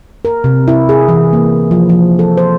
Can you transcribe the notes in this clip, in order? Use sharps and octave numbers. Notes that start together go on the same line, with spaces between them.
A#4
C3
E4
G#4
E3
A#3
F3
F3
A4
C5